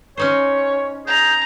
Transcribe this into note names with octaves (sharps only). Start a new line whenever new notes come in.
C#4 D#4 C5 C#5 C#6
G#4 A#5 G6